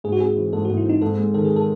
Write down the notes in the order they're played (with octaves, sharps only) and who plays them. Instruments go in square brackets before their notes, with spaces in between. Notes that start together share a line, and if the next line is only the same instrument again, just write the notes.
[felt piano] G#2 [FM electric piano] G#4
[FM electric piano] F#4
[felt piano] C4 [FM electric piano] G#4
[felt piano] E3
[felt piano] G#2 [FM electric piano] A4
[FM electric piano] F#4
[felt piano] G#2
[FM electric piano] E4
[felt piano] C4 [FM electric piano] D#4
[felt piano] G#2 [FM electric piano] A4
[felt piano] G#3
[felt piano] D#3 [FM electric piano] A4
[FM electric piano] G#4
A4